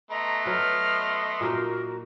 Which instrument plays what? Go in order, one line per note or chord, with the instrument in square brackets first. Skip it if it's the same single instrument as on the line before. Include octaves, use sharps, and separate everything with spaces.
[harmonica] A3 B3 C6 [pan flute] D#5 [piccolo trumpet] A#5
[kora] F#3 B4 [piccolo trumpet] F6
[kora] A#2 A#3 D#4 [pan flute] F#4 [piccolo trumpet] A#4